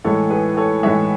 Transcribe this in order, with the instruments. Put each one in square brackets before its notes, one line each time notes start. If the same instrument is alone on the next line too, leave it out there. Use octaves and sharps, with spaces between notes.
[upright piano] A2 E3 G#3 A4 C#5
G#4 B4
A4 C#5
A2 E3 G#3 C#5 E5